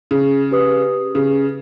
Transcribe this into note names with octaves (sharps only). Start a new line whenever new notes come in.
C#3
G4 B4 D#6
C#3